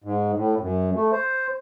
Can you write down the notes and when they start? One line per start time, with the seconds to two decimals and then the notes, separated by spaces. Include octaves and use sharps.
0.04 G#2
0.35 A2
0.60 F#2
0.95 A3
1.12 C5